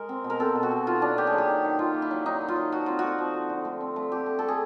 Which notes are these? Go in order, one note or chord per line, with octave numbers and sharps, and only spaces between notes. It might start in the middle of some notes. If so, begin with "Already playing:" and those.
Already playing: G#3 A#4
C4
B2
A#4
C4 A4
B2
F#4
B2
D#3 F4
F#3 D4
A#3 G4
G#4
F#3 G4
D#3
D#3
D#3 F4
A#3
E4
F#3
F#3 D#4
D#3
F4
F#3
F3 F#4
C4 F4
A3 F#4
F3
F3
D3
A3
C4
A3
C4 G4
A3
A3 A4
G#4